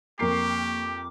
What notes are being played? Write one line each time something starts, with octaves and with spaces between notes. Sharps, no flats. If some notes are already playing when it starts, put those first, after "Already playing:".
F2 A#3 G4 A#4 C#6 D6 C7